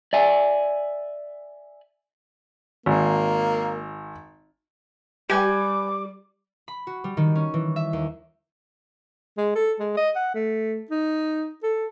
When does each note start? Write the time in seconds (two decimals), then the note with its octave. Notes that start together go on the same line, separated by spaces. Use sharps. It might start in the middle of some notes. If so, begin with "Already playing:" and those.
0.13 D5 E5 G#5
2.86 G#1 A#3
5.30 G3 G4 B4 G5 G#5 D6
6.68 B5
6.87 F#4
7.04 G3
7.17 D#3
7.35 C#4
7.54 E3
7.76 E5
7.93 D#2
9.37 G#3
9.55 A4
9.80 G#3
9.97 D#5
10.16 F#5
10.34 A3
10.91 D#4
11.63 A4